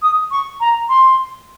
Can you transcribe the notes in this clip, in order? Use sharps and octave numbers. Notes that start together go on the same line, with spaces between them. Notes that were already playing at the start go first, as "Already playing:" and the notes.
D#6
C#6
A#5
C6